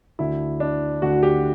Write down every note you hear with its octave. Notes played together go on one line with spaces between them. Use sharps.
D2 D3 E4
D4
D2 D3 F#4
G4